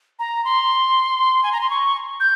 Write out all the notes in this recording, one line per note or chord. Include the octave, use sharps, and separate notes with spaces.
A#5
C6
G#5
A#5
C6
C#6
G6